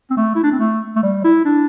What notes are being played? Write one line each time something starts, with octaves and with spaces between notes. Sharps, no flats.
C4
A3
E4
D4
C4
A3
A3
G3
E4
D4